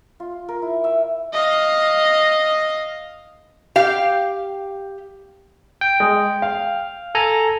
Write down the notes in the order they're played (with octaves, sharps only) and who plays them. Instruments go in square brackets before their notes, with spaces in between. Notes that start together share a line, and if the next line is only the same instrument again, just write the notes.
[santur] F4
A#4
E4
E5
[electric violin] D#5 F5
[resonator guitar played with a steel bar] G4 F5
[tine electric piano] G5
[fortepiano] G#3
F5
[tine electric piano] A4 G#5 A#5